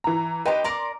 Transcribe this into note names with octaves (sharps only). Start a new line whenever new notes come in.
E3 A#5
D#4 G4 B4 G5 C6
A#4 D5 A#5 C6 D6